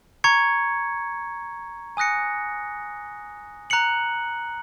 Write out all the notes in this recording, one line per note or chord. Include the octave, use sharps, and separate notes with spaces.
A#5 C#6 G#6 C#7
G#5 D#6 F#6 A#6 C#7
A#5 F#6 C#7 F#7